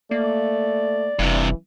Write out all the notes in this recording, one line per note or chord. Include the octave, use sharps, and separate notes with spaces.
A3 A#3 D5
F1 G2 C3 E3